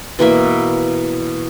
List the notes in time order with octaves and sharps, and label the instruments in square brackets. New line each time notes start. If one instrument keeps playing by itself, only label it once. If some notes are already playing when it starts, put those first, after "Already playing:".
[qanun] B2 E3 A#3 E5